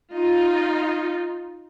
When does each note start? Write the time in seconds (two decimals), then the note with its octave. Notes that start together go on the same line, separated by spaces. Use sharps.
0.14 D#4 F4